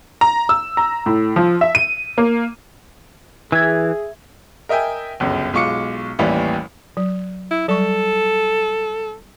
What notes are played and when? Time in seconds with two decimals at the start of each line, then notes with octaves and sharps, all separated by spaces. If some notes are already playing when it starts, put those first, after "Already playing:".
0.21 A#5
0.49 E6
0.77 A#5
1.06 A2
1.36 F3
1.61 E5
1.75 D#7
2.18 A#3
3.52 E3 G#4 E5 G#6
4.69 A#4 D#5 E5 G5 G#5
5.20 G1 C#2 F#2
5.53 B1 G#3 F4 C#6 D6 C#7
6.19 A1 D#2 E3 G3
6.97 F#3
7.51 E4
7.69 F#3 G3 A4 C#6